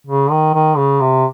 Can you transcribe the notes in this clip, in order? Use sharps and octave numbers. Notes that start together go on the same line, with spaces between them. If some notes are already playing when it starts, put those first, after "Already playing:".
C#3
D#3
D#3
C#3
C3